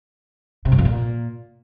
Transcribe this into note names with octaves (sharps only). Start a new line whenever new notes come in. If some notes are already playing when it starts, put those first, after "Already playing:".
C3
F#2
F2
A#2